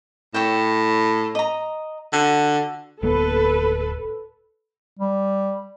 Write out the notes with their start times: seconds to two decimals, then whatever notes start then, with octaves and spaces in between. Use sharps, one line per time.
0.34 A2 C#5 G5
1.35 D#5 A#5
2.13 D3 F#4
3.03 D1 A#3 B3 A4 B4
4.99 G3